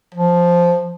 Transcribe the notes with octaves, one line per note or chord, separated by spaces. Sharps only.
F3